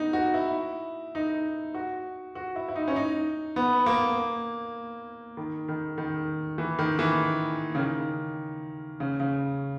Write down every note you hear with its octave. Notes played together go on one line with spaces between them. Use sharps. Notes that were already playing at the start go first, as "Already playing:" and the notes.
Already playing: B3 D#4
F#4
E4
D#4
F#4
F#4
E4
E4
D#4
C#4
D#4
B3
A#3
D#3
D#3
D#3
E3
D#3
E3
C#3
D#3
C#3
C#3